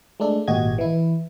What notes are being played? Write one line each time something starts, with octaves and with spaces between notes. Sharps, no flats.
G#3 A3 D4 A4
G#1 A#2 F#4 G4 D#5 G#6
E3 E4